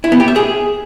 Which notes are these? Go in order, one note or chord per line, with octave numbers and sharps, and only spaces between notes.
E4
B3
G4
E5
G#4